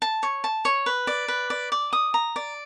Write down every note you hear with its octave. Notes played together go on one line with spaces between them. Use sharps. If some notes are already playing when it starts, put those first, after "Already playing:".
A5
C#5
A5
C#5
B4
D5
B4
D5
D5
D#6
A#5
D5